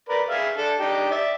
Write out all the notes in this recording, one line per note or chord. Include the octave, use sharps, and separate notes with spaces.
A#4 B4 D5
G#4 E5 F5
D4 A4
D4 D#4 G4
D5 E5